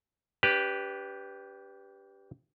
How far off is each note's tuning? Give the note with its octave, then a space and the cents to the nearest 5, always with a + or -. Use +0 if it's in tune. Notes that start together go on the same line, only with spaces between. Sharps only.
D4 -40 G4 +0 B4 +0